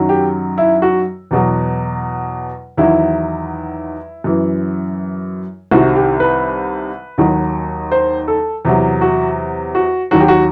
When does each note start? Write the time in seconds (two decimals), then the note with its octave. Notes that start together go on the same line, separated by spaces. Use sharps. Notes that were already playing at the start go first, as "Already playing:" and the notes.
Already playing: F#2 D#3 F#3
0.09 G4
0.58 E4
0.82 F#4
1.31 E2 B2 F#3
2.77 E2 D#3 F#3 E4
4.24 F#2 E3
5.71 C2 C3 D#3 F#4
5.96 G4
6.20 B4
7.18 D#2 D#3 F#3
7.92 C5
8.28 A4
8.65 E2 C3 F#3
9.01 F#4
9.75 F#4
10.11 D#2 D#3 F#3 F#4
10.20 G4
10.28 F#4